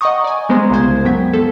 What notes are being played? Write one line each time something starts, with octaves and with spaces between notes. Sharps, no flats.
D#5 F#5 G5 A#5 C#6 D#6
D5 G#5
G3 G#3 B3 C5 A#5 C6
C2 C#3 G#3 C5 G#6
F#2 F#3 B3 G5 G#6 B6
F3 A4